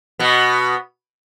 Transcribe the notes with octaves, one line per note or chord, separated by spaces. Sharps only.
B2 B3